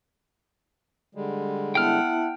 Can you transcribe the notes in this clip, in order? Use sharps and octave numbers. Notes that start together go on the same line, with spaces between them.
D3 G3 G#3
B3 E4 E5 F#5 G5 A5 F6